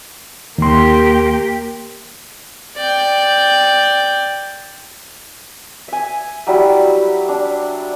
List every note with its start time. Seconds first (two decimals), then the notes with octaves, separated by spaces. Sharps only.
0.58 D#2 A#3 G4 C6
2.77 D5 G5
5.88 E5 G#5
6.47 F#3 G3 E4
7.29 D4